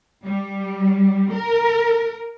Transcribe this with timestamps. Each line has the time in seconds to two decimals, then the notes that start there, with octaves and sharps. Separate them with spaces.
0.25 G3
1.32 A#4